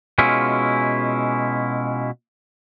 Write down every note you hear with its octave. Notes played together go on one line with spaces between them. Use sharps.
B2 G#3 C#4 E4 F4